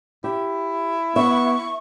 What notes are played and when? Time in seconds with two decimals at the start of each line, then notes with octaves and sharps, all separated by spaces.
0.24 E4 G4
1.16 B3 E5 C#6